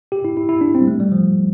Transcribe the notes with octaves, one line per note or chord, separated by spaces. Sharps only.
G4
E4
E4
E4
D4
C4
G3
A3
G3
F3